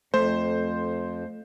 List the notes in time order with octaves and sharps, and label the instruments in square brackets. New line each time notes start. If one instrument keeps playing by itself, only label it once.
[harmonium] F2 [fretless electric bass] A3 [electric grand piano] C5